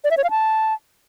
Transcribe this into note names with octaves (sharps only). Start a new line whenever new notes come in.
D5
E5
C#5
F5
A5